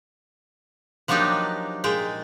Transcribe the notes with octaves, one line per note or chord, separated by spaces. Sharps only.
F3 F#3 A#3 D4 D#4 G4
A#2 G#3 G5